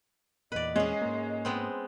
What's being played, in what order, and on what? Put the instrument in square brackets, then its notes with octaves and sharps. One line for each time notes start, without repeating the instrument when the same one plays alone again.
[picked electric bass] E2 A#2 [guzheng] B4 D5 [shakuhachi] D#5
[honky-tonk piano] G#3 [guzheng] C#4 G#4
[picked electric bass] G#2 A#3
[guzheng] G#3 B3 C4